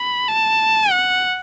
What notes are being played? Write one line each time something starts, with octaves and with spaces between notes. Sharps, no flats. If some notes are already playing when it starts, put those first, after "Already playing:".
Already playing: B5
A5
F#5